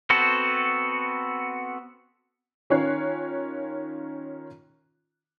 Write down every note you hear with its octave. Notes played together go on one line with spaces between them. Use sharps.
B3 C4 F#4 A4
D#3 C#4 F4 C#5 F#6 C7